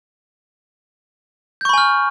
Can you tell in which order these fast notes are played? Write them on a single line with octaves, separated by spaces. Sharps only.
G6 C#6 B5 G#5 F6